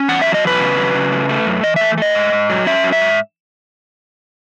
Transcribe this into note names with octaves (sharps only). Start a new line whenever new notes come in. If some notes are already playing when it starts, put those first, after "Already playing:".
Already playing: C#4
E2 F#5
F#3 E5
D#5
E2 B4
C#3
F#3
C#3
A3
A3
F#2
E3 D#5
A3 E5
A3 D#5
G#2
G#2
F#3
C#4 E5
F#3
E5
G#2